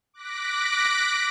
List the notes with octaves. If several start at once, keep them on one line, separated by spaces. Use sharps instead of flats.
D6 F#6 A#6 B6 D7